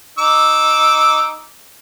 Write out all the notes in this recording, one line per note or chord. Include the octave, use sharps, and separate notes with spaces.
D#4 D6 E6